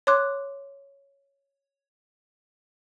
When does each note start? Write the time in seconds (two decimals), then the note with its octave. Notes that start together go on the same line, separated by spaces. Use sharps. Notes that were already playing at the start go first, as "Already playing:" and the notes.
0.07 C#5 C6 D6 F#6